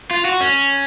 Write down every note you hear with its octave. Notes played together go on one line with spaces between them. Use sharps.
F4
F#4
C#4